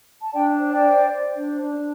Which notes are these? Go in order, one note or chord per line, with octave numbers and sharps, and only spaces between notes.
A5
D4 D5 G5
C5
D5 G5
C5
C5
D4
D4